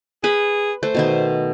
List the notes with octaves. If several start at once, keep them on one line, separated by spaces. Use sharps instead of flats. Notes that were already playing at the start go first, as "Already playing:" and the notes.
G#4 B4 B5
A3 C5
B2 D#3 B3